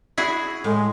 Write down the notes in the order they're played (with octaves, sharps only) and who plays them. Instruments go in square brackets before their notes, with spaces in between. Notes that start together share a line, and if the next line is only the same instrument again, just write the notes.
[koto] E4 F#4 G#4
[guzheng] A2 [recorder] G#3